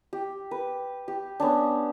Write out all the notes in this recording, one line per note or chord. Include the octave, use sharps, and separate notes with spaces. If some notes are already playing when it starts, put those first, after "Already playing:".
G4
B4
G4
B3 C#4 D4